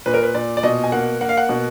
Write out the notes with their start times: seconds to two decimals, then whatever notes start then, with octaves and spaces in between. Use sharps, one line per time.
0.06 A#2 B4
0.14 A#4
0.23 B4
0.34 A#2 D5
0.57 D5
0.63 B2 D#5
0.84 G#5
0.92 A#3 F#5
1.21 A#3 F#5
1.29 F5
1.37 F#5
1.49 B2